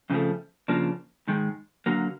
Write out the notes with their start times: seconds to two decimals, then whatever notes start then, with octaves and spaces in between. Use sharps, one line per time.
0.10 F2 C#3 F3 A3
0.68 C#3 F3 A#3 D4
1.28 G#2 D#3 G#3
1.86 D3 F#3 A#3